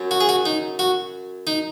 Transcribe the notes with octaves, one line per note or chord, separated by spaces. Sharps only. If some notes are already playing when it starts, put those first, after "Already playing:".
Already playing: F#2 F#3
F#4
G#4
F#4
D#4
F#4
D#4